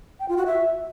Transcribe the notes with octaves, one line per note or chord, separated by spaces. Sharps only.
G5
F4
F#4
E5